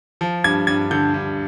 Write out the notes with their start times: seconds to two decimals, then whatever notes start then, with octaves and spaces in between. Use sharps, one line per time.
0.21 F3
0.44 G2 G#6
0.67 G2 G#6
0.91 D3 G6
1.14 G2